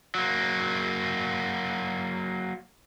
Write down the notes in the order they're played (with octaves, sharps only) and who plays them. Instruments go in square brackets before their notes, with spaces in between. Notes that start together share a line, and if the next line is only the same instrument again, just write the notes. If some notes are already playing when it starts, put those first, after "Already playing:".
[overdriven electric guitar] F#3 A#3